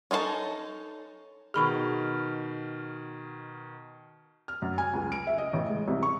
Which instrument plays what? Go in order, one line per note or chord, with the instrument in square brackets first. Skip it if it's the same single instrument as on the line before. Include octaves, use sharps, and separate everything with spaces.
[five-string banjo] C#4 D#4 F4 A4 A5
[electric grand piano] B2 D#3 F6 [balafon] G#4 B5 C#6
[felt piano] F6
F#2
G#5
C#2
D7
E5
D#5
A1
G#3
C2
C#6